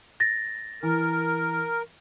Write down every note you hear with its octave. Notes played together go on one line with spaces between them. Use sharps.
A6 A#6
E3 A#4